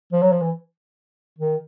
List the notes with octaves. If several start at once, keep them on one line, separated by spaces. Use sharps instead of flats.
F3
F#3
F3
E3
D#3